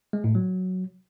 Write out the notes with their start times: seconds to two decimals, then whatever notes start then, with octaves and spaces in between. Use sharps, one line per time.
0.13 G#3
0.24 A2
0.35 F#3